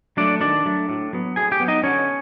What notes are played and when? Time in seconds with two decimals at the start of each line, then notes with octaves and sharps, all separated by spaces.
0.17 F#3 A3 D4 D5
0.41 D#3 D4 D5
0.65 F#3 A3
0.89 A2
1.13 F#3 B3
1.36 A2 G#4 G#5
1.52 G4 G5
1.60 F#3 B3
1.68 D#4 D#5
1.83 D3 C#4 C#5